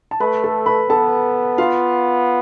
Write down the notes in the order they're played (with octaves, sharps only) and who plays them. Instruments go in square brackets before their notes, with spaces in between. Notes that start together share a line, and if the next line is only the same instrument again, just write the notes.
[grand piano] A5
[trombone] A3 [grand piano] B4 B5
[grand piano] A4 A5
B4 B5
[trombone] B3 [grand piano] A4 A5
[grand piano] F4 F5